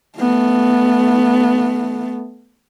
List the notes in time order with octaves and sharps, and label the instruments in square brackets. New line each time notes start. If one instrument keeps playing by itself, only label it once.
[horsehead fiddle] A3 B3